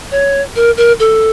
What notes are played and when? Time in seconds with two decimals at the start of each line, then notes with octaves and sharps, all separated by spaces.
0.12 C#5
0.56 A#4
0.77 A#4
1.00 A4